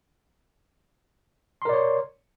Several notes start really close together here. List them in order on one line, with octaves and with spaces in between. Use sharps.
C6 A#4 D5 C#5